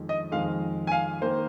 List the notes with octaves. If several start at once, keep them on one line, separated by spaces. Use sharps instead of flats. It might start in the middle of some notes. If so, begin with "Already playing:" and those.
Already playing: F2 D#3 G#3
D#5
F2 D#3 G#3 F5
G#5
F5
D#3 A#3 C5